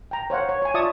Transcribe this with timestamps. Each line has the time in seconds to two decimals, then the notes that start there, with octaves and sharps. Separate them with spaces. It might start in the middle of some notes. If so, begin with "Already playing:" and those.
0.11 G5 A#5
0.30 C5 C#5 F5 F#5
0.49 C#5
0.62 C#5 G#5
0.74 F4 D5 E5 A5 C#6 D#6